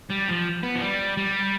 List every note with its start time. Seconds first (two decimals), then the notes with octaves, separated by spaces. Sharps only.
0.10 G3
0.28 F3
0.63 B3
0.75 F3
0.82 G3
1.17 G3